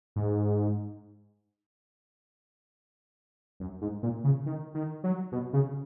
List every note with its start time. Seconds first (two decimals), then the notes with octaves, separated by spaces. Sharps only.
0.16 G#2
3.60 F#2
3.81 G#2
4.03 A#2
4.24 C#3
4.46 D#3
4.74 D#3
5.04 F#3
5.32 B2
5.53 C#3